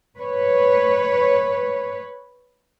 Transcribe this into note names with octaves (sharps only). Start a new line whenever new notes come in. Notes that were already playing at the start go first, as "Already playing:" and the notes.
B4 C#5